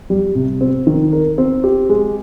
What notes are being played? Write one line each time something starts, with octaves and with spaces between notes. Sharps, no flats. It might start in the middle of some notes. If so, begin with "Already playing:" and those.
G3
C3
C4
D#3
A#4
C4
G4
G#3